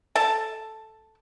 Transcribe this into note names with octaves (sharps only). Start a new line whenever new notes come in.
A4 A5